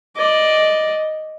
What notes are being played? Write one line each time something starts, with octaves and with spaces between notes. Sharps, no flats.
D5 D#5